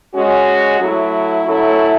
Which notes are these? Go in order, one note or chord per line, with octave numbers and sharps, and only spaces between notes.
G#3 C#4 F#4
F#3 A3 E4
F#3 A3 C#4 E4 A4